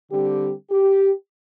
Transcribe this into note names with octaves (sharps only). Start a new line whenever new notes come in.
D3 G3 C4 G4
G4